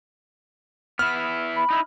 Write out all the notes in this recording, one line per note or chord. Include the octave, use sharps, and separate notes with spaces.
B3 E4 F6
B5
D#4 E4